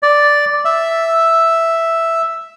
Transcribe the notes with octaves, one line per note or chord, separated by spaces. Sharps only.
D5
E5